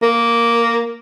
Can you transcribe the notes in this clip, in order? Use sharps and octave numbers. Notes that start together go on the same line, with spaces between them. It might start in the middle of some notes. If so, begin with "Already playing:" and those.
A#3